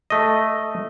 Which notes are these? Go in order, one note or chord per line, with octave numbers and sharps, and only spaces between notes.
A3 D#5